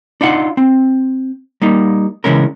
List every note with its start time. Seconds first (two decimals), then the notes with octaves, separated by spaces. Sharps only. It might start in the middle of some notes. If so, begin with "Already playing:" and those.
0.21 D4 D#4 F4 F#5
0.57 C4
1.62 G3 A#3 D#4
2.24 C#3 E3 G#3 C#4 A#4